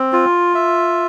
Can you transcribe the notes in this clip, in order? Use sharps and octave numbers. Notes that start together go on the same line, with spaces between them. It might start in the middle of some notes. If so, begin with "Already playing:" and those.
Already playing: C4
F4
E5